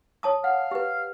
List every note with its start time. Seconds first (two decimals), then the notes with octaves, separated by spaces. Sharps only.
0.23 C#5 A5 D#6
0.44 F5 F#5
0.71 G4 B4